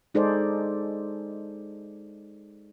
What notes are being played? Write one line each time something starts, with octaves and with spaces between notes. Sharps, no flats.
G#3 D#4 G#4 A4 C5 D5